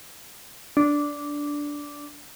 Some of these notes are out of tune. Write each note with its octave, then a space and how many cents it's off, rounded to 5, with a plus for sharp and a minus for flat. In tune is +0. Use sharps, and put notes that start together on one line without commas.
D4 -10